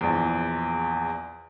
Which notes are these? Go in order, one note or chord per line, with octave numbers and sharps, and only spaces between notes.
A#1 E2